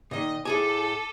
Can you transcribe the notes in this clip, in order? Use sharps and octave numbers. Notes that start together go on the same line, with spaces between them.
A#2 D#3 D#5
A2 G#4 A4 G#5 D6 D#7